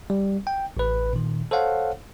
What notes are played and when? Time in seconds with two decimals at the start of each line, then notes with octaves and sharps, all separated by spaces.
0.10 G3
0.47 G5
0.77 A1 B4
1.13 A#2 D#3
1.51 A4 C5 C#5 F5 F#5